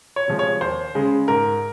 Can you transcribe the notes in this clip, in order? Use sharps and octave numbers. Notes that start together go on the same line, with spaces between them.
C#5
C3 F3 G#3
C#5
D#2 C5
C#3 G#3
G#2 A#4